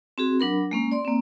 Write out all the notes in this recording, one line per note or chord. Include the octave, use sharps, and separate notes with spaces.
C4 F#4 G#4
F#3 D4 A#4 B5
G#3 A#3 C#4
D5 C6
A#3 C4